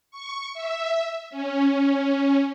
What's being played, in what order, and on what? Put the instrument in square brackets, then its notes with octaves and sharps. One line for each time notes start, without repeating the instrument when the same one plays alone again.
[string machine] C#6
E5
C#4